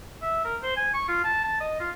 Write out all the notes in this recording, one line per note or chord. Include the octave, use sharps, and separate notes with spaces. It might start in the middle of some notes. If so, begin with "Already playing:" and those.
E5
A#4
C5
G#5
C#6
F4
A5
A5
D#5
F4